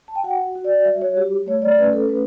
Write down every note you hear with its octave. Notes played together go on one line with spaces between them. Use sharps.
A5
G5
F#4 F#5
F#4
D5
G3 E5
C#5
G3 G4
A3 C#5
D5
C#4 B4
A4
A3 B4